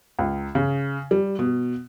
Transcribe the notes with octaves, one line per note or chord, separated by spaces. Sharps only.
C#2
C#3
G3
B2